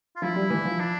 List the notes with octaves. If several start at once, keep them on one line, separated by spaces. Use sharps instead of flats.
F4
F3 E4
G3
E3
F3
D4